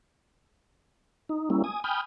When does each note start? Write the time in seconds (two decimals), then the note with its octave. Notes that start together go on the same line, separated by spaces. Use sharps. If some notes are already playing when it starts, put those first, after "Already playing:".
1.29 D#4
1.50 G3 A#3 C#4 E4
1.64 G#5 D#6
1.84 G5 G#5 B5 D#6 F6 G6